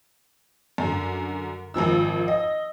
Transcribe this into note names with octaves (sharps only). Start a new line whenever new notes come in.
F#2 D3
G#1 F2 F3 E6
D#5